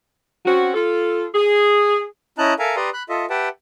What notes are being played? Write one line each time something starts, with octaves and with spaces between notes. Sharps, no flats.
C4 C#4 F#4
F4 A4
G#4
C#4 E4 D#5 A5 A#5 F#6
A4 A#4 E5 F5 G#5 A#5
G4 B4 D5 A#5 C6 D#6
B5 F#6
F4 A4 D#5 E5
G4 B4 E5 F#5 G5 A5